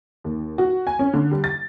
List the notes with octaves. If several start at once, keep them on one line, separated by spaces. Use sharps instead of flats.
D#2
F#4
G#5
C#4
D3
G3
A6